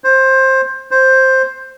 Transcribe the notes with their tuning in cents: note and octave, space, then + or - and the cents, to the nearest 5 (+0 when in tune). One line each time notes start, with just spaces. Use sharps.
C5 +15
C5 +5